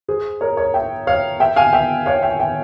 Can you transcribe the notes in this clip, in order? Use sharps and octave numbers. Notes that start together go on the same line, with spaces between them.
G#4 C5
A#4 C#5
A#4 C#5
E5 G5
C#5 F5
E5 G5
F5 G#5
E5 G5
C#5 F5
E5 G5
E5 G5